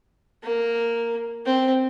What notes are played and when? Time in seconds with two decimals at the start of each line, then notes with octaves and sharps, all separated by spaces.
0.43 A#3
1.46 C4